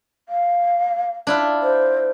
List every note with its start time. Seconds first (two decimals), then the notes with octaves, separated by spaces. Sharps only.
0.29 F5
1.27 D4 E4 F4
1.62 C5